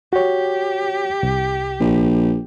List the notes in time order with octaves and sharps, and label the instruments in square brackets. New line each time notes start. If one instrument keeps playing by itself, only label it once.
[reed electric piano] F#4 C#5 [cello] G4
[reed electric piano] C2
[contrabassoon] A#1